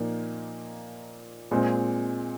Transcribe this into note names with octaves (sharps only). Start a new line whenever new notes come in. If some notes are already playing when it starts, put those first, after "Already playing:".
Already playing: A#2 F3 A#3 D#4
A#2 G#3 C4